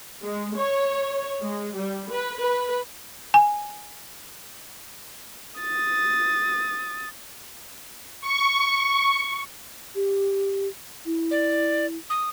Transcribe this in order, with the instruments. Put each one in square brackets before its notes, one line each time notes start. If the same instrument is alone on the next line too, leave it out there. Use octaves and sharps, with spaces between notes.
[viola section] G#3
C#5
G#3
G3
B4
B4
[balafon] G#5
[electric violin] D#6 A6
[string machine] C#6
[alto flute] G4
E4
[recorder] D5
D#6